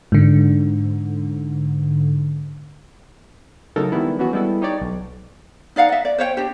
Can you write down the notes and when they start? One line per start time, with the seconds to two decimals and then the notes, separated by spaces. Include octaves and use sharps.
0.12 G#2 D3
3.76 C#3 F#3 A3 D#4 A4 A#4
3.92 D#3 G3 G#3 B3 E4
4.19 E3 F#3 B3 C#4 F#4
4.33 G3 G#3 B3 E4 A4
4.62 D#4 G4 C#5 D5
4.81 B1
5.76 D#4 D5 F5 F#5
5.89 D#5 E5
6.05 D5
6.18 C5 C#5 F5 G5
6.37 D4 G4